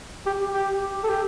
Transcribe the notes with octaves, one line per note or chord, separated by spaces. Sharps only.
G4
G4
A4
G4